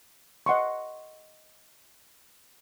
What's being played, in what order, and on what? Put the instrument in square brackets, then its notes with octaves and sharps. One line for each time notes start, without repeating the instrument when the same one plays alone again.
[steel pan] D#5 F#5 C6 C#6